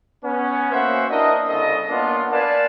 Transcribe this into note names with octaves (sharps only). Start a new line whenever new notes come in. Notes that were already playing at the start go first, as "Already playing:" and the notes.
B3 C#4
A#3 C#4 F#4 C5 E5 F#5
D4 E4 A#4 D#5
C2 C#3 A4 D#5
A#3 B3 C#4 D4 F4
A#4 B4 D5 F5 G#5 A5